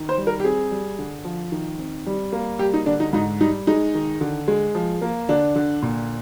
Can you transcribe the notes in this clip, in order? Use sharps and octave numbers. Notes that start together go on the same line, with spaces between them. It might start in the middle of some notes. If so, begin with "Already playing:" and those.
Already playing: D#3
C5
G3
A#4
G4
C4 G#4
G3
D3
F3
D#3
C4
G3
A#3
G3 G4
D#4
D3 D4
D#4
G#2 D#4
G3 D#4
G#3 D#4
D#3
D3
G#3
F3
A#3
D3 D4
D3
A#2